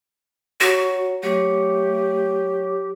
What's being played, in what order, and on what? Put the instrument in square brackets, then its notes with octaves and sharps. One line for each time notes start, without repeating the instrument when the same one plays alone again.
[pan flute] F#4 [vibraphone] C#5 F#5 A#5
[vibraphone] F#3 C#5 C#6 [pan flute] A3 [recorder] G4